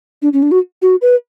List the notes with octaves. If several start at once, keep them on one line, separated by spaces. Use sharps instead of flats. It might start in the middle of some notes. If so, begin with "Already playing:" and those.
D4
C#4
D4
F#4
F#4
B4